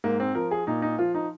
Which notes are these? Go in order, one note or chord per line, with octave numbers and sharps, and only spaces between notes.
G#2 A#3
C4
F3 A#4
G#4
A#2 D#4
D#4
F3 F4
D#4